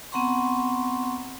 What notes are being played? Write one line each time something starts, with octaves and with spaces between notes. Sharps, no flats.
B3 C4 F#5 A#5 C6 C#6